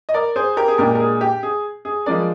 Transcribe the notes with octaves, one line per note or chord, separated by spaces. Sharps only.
D#5
A#4 D5
G#4 C5
G4 A#4
G#4
A#2 G#3 D4 G4 A#4
A#4
G#4
G4
G#4
G#4
F3 G#3 D4 A#4 D5